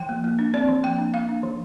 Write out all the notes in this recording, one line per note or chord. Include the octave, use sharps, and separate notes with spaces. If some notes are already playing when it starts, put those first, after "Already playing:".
Already playing: F3 G5
A#3
A#3
D4
C4 D5
F3
A#3 G5
D4
A#3 F5
D4
F3